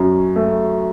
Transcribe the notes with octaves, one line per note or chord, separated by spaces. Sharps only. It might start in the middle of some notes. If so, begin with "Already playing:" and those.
Already playing: F#2 C#4
A3